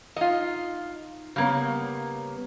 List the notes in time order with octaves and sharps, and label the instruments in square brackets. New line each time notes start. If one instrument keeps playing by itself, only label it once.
[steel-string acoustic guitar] D#4 [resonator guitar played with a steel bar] F4 D#5
[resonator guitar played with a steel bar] C#3 A#3 [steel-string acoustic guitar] G3 B3 C#5